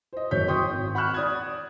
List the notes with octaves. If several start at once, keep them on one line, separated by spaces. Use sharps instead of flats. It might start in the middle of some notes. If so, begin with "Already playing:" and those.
C5 D#5
F#1 F#3 C#5 G6 B6
G5 C6 C#6 D#6 G6
G#1
F#5 B5 C#6 F6 F#6 E7
D5 D#6 G#6